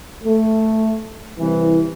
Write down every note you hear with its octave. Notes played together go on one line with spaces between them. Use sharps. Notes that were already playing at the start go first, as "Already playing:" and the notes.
A3
C2 E3